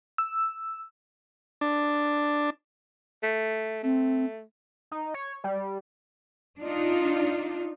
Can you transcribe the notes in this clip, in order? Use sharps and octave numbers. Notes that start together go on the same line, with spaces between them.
E6
D4
A3
A3 C4
D#4
C#5
G3
D4 D#4 F4